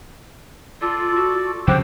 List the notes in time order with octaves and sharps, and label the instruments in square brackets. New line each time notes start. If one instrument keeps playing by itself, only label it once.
[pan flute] F4 [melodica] A4 D5
[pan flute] F#4
[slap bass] C#3 F3 C4 [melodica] G4 F#5 G5 [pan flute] C5